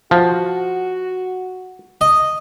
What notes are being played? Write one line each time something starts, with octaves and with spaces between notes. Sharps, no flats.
F3 F#4
D#5